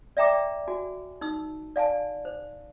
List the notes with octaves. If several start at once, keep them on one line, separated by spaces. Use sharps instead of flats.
D5 E5 G5 A#5 D6
F#4 G#5
D#4 E6
D5 F5 G#5 A5
C5